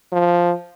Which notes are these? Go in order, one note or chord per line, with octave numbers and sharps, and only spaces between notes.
F3